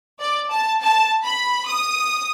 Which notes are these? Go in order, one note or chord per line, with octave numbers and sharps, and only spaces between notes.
D5
A5
A5
B5
D#6